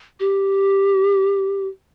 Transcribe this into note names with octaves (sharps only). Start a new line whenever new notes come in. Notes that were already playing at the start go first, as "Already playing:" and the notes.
G4